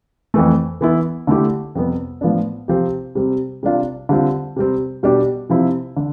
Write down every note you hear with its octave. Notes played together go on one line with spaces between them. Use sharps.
F2 E3 A3
E3 B3 E4
D3 A3 E4 G4
F2 C3 G3 B3
A2 F3 B3 D4
C3 F3 C4 G4
C3 G3 C4
C3 G3 D4 F4
D3 G3 C4 F4
C3 G3 C4
B2 G3 D4 G4
C3 F3 C4 E4
D3